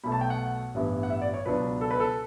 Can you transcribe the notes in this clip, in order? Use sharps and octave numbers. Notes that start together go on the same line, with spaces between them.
B1 B2 A3 B5
A5
G5
F#5
A1 G2 E3 B3 E4
F#5
E5
D5
C#5
C#2 B2 F#3 B3 D4 B4
A4
B4
A4